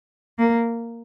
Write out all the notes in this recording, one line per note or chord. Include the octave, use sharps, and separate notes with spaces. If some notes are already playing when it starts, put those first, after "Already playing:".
A#3